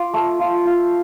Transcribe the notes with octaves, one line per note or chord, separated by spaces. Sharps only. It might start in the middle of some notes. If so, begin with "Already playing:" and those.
Already playing: F4 D6
A3
F4
F4